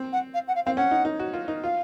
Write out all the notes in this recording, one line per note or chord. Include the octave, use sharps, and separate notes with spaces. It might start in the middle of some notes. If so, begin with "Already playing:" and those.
Already playing: C4
F#5
F5
F#5
F5
C4 F5
C#4 F#5
D#4
D#4
F#4
F4
D#4
F4 F5